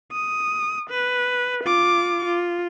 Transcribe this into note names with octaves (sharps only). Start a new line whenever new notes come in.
D#6
B4
F4 D6
F4